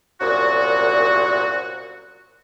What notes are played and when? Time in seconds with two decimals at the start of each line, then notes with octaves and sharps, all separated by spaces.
0.21 C2 F#2 A#2 F#4